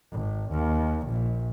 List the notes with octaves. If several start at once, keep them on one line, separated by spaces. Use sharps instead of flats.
G#1
D#2
A#1